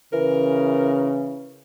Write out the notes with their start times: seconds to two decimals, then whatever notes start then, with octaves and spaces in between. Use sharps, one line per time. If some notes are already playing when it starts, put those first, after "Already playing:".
0.13 C#3 E3 A#4